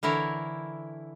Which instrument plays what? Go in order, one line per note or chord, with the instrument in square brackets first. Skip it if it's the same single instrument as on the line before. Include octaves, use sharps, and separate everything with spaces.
[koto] D3 E3 E4 A#4 C#5